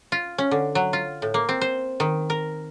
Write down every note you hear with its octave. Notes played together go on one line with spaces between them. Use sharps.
F4
C#4
D3
F#3
F4
A2
A#3
C4
C5
D#3
A#4